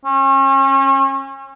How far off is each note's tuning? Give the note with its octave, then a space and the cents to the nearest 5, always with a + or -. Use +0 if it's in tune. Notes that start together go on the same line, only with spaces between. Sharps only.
C#4 -35